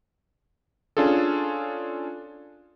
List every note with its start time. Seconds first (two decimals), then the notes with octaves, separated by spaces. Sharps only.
0.97 C#4 D4 F4 G#4 A4